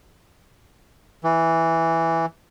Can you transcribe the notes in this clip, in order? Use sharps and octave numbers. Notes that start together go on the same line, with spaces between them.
E3